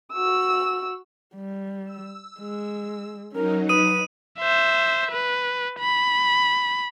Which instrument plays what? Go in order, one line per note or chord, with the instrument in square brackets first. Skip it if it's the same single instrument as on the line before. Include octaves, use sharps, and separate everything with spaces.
[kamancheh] F#4 E6
[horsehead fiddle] G3
[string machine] E6
[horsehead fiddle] G#3
[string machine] F#3 D#4 [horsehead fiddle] C#4 A#4
[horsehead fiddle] B4 [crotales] D#6 D#7
[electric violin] C5 E5
B4
B5